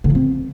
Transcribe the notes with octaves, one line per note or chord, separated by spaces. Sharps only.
D3
F3
C4